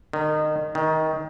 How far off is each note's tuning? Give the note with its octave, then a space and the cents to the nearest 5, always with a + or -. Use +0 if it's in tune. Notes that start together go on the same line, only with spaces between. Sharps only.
D#3 -25
D#3 +20